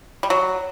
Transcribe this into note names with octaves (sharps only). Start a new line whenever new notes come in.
G3
F#3